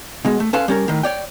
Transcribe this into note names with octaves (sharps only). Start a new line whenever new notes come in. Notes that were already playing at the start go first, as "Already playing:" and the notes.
B2 G#3
A3
C#4 A4 B4 F5 A5 C6
G3 C#4 A#4
A2 D#3
C#5 D5 G5